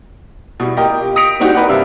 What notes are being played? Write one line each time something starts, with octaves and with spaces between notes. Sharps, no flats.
B2 G3 E4
F4 G4 A#4 D#5 G5
D#6 A#6 B6 C#7 D7 F7
G3 C4 D4 D#4 F#4 G4
A#4 B4 D5 D#5 F#5
G2 C3 E5 F5